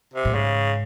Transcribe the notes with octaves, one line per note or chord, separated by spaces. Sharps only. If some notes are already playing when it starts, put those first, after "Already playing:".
C3
A2
G#2 C#3